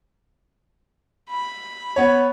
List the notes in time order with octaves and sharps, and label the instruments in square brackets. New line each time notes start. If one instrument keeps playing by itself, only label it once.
[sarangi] B5
[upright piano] B3 C#5